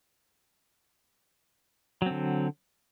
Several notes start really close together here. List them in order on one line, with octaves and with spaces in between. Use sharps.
F#3 C4 D3